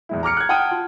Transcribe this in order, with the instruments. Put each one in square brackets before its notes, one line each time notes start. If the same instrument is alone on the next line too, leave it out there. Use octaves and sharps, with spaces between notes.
[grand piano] E2 G#3 E4
A#5 D6 F6 C#7
F#6 G#6
F#5 G5 A5 D#6 F6 D#7
F4